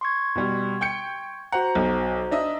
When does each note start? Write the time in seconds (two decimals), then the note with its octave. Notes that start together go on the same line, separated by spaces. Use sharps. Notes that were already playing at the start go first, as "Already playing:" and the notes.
0.01 C6 C#6 G#6
0.35 B2 G3
0.81 G5 G6 C#7
1.52 F#4 C5 F#5 A#5
1.75 B1
2.31 D4 D#5 E5